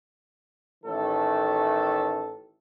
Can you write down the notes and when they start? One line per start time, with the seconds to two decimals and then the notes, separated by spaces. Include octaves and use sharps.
0.84 A1 A2 D#3 A4